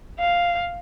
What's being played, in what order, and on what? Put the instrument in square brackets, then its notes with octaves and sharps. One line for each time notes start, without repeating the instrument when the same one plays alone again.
[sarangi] F5